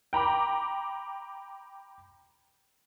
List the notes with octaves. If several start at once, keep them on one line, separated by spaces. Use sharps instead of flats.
G5 A#5 B5 D6